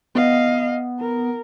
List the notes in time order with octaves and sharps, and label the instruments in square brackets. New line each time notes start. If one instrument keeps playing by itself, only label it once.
[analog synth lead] B3 [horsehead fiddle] D#5 F5
[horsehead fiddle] A#4